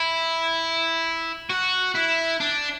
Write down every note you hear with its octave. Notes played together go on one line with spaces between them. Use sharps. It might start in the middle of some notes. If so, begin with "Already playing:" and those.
Already playing: E4
F#4
E4
D4